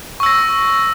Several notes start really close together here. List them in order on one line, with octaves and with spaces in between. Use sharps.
C#6 E6 A#6